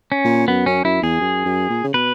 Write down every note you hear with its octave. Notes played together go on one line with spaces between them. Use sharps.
C#4
A#2
F#2 B3
F#2 C#4
F#2 E4
E2 G#4
F#2
F#2
A#2
C#3
B2 B4